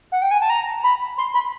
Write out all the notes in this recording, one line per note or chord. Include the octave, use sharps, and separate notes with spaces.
F#5
G5
G#5
A5
A#5
B5
C6
B5